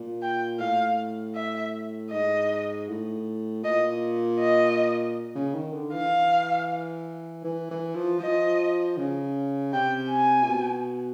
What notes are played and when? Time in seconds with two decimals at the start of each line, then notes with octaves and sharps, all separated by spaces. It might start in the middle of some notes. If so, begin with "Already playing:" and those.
Already playing: A#2
0.22 G5
0.60 A2 F5
1.35 E5
2.11 G#2 D#5
2.88 A2
3.63 A#2 D#5
4.40 D#5
5.35 C#3
5.55 D#3
5.73 D3
5.93 E3 F5
7.44 E3
7.70 E3
7.95 F3
8.20 F3 D#5
8.97 C#3
9.73 C3 G5
10.10 G#5
10.43 A#2
10.49 B2